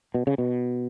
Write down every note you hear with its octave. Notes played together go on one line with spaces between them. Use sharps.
B2
C#3
B2